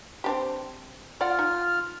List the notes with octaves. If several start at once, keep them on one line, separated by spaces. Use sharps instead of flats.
C4 D4 G4
F4 D5 F#5 F6
D#4